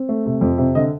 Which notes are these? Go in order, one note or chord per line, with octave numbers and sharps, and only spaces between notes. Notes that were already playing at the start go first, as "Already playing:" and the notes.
Already playing: C4
A3
C3
F2
C3
D3 D#5